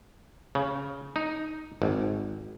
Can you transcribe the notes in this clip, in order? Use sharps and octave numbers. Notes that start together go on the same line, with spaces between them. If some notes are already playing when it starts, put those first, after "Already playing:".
C#3
D#4
G#1